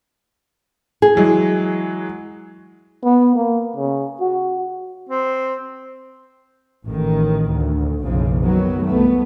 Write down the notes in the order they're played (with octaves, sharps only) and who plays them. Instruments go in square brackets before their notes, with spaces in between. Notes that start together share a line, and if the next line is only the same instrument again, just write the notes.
[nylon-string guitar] G#4
[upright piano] E3 F#3 G#3
[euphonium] B3
A#3
C#3
F#4
[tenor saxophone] C4
[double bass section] A1 A2 D#3
D2
F#1 B1 C#3 F3
D#3 F#3 B3
C2 A3 B3